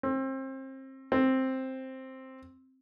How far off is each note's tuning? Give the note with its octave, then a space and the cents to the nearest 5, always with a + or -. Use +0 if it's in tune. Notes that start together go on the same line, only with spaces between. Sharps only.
C4 +30
C4 +5